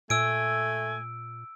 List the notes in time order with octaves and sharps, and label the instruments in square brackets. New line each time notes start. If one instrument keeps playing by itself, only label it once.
[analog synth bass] A#2 [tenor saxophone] A3 [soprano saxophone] G#5 [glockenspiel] E6 D7